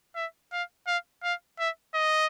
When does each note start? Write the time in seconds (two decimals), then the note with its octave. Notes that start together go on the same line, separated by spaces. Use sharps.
0.15 E5
0.52 F5
0.87 F5
1.23 F5
1.59 E5
1.94 D#5